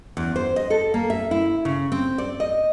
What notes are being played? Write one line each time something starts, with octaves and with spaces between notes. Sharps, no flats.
E2
C5
D#5
A4
A#3
E5
E4
C#3
C4
D5
D#5